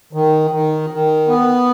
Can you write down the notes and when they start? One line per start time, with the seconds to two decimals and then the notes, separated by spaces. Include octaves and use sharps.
0.13 D#3
0.51 D#3
0.90 D#3
1.28 B3